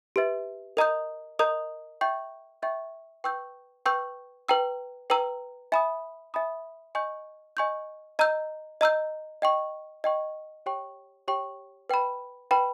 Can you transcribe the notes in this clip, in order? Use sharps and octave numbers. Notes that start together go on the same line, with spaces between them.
G4 B4 E5
A#4 D#5 A#5 D#6 G6
A#4 D#5 A#5 D#6 G6
E5 G5 C#6 G6
E5 G5 C#6 G6
B4 G5 C#6 E6 G6
B4 G5 C#6 E6 G6
B4 G5 A#5 E6
B4 G5 A#5 E6
E5 G#5 B5 D#6
E5 G#5 B5 D#6
D#5 G#5 C#6 G6
D#5 G#5 C#6 G6
D#5 A#5 E6 G6
D#5 A#5 E6 G6
D#5 G5 C#6
D#5 G5 C#6
G4 C#5 G5 C#6
G4 C#5 G5 C#6
B4 G5 B5
B4 G5 B5